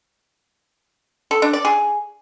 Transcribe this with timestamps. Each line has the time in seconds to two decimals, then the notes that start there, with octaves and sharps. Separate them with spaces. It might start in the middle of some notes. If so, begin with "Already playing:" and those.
1.31 A4
1.42 D4
1.53 D5
1.65 G#4